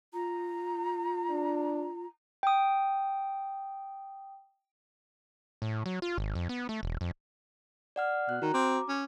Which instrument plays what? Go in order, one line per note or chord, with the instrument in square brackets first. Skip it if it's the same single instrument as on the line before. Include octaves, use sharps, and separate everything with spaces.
[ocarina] F4 [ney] A#5
[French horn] D4
[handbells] G5 D#6
[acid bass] A2
F#3
F4
G#1
F2
B3
A3
E1
F2
[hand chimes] D5 F#5 F6
[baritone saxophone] B2 [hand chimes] F#6
[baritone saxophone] D#3 [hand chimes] F#4 A#5
[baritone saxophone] C4 [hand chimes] D6
[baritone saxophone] C#4